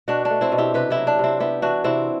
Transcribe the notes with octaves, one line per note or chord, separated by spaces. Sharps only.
B2 D4 F#4
D4
A3
C4 E4
B2
E4 G4
C3 G4 B4
E4 G4
F#3
D4
C3 C4 E4
B3 E4 G4
E3 D4 F#4
C3 C4 E4